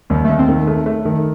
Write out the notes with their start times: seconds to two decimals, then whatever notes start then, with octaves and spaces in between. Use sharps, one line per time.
0.10 D#2 G3
0.24 D#2 A3
0.39 C4
0.49 D#3
0.67 A3
0.86 A3
1.05 D#3